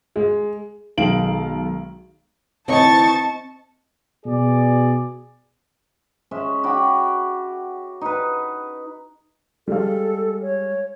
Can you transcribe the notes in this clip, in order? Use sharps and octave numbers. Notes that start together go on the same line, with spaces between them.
G#3
B1 D#3 G#3 F5 D7 F#7
D2 E3 C4 D#4 D#5 A5 C#6 A6
B2 G#4 D5
G#3 C#4 E5
F#4 G5 B5 D6
D#4 B4
G3 G#3 A4 F5
C#5